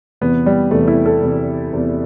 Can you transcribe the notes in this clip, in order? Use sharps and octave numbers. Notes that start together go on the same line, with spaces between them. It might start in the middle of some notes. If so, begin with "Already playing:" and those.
E2 C3 E3 B3
G3
E2 C3 E3 A3
E4
A4
E2 C3 E3
E2 C3 E3